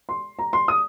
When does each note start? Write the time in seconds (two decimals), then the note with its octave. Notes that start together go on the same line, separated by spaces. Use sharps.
0.09 C6
0.39 A#5
0.53 C6
0.68 D#6